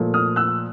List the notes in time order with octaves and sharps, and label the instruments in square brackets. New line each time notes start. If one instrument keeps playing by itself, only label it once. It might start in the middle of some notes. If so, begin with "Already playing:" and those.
Already playing: [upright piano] A#2 F3 A3
D#6 F6
E6 F#6